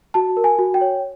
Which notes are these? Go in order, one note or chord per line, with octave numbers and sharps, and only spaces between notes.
F#4 A5
A#4
G#5
F#4
G5
C#5